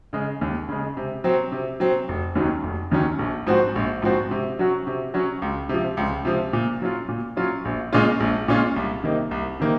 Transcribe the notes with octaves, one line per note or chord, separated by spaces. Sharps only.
C#3 G#3
D#2
C#3 G#3
C3
F#3 C4
C3
F#3 C4
F1
D#2 D#3 F#3 C#4
F1
D#2 D#3 F#3 C#4
A#1
G#2 F3 C4 F#4
A#1
G#2 F3 C4 F#4
C3
F#3 C#4 F#4
C3
F#3 C#4 F#4
C#2
C3 F3
C#2
C3 F3
A#2
F#3 C#4 F4
A#2
F#3 C#4 F4
A#1
A#2 G#3 C#4 F4
A#1
A#2 G#3 C#4 F4
C2
C3 D#3 A#3 D#4
C2
C3 D#3 A#3